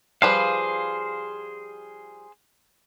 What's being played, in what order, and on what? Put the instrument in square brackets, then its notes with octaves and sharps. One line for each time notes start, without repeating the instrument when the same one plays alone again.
[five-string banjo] F3 G3 B4 [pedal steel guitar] G#4 C5 F5